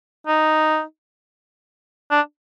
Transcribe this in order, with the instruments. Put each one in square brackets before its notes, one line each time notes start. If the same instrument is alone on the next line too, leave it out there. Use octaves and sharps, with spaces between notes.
[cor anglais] D#4
D4